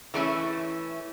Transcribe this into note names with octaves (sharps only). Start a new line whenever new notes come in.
E3 A3 C#4 E4